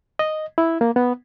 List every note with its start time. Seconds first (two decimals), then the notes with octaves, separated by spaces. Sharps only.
0.19 D#5
0.58 E4
0.81 A#3
0.96 B3